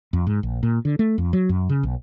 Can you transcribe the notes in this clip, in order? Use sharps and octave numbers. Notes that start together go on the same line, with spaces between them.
F2
G#2
A#1
A#2
D3
A3
F2
F#3
F#2
C#3
B1